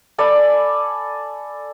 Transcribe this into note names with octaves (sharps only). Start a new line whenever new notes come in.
A4 D5 G#5 B5